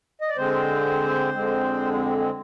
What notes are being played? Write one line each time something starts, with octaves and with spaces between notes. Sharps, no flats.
D#5
D5
D3 G#3 C4 C5
F2 D3 G#3 C4
C4
C4
C4